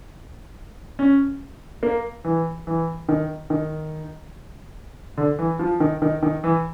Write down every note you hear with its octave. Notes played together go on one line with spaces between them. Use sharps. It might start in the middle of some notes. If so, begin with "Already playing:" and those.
C#4
A#3
E3
E3
D#3
D#3
D3
E3
F3
D#3
D#3
D#3
E3